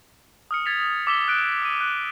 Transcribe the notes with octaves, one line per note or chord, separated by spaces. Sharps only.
D#6 F6 C#7
G#6 A6 B6 F7
D6 E6 B6 E7 G7
F#6 D7
E6 D#7
F#6